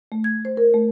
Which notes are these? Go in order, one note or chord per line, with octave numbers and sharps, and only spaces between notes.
A3
G#6
C5
A#4
A3